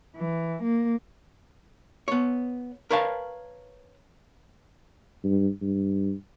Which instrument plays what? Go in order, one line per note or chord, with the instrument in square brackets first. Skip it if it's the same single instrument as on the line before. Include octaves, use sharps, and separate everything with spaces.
[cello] E3
A#3
[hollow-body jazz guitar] B3 C#5
A#4 B4 C#5 F5 A5
[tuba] G2
G2